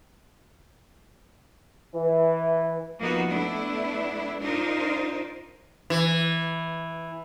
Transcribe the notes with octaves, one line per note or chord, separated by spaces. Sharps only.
E3
F3 A#3 B3 D#4 F4 F#4
A3 B3 D4 E4
D4 D#4 F4 A#4 C5
E3